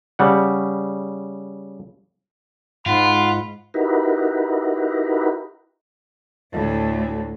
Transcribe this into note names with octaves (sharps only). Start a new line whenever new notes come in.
C#3 G3 F#5
G#2 F4 F#5 B5 C6
D#4 E4 F#4 G4 A#4 B4
D2 A2